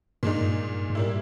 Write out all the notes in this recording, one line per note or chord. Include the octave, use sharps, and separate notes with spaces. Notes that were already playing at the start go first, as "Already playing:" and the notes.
G2 A#2 G#3 D#4
G2
G2
G#2 G3 A#3 E4